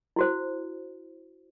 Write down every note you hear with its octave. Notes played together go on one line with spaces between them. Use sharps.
E4 F#4 C5